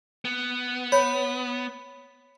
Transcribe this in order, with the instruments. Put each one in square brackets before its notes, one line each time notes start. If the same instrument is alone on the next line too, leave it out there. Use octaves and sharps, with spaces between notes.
[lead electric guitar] B3
[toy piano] C#5 [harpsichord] B5